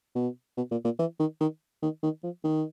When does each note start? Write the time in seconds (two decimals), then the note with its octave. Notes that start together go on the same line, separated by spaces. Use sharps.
0.15 B2
0.57 B2
0.71 A#2
0.85 A#2
0.99 E3
1.20 D#3
1.41 D#3
1.82 D#3
2.03 D#3
2.24 F3
2.44 D#3